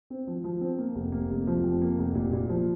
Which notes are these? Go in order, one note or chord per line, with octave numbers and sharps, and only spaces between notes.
C4
F3
F3
C4
A#3
F1
A#3
F1
F3
F2
A#3
F1
A#2
A#2
F3